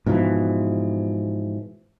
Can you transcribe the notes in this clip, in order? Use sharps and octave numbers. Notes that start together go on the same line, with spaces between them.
G#2 B2 E3 F3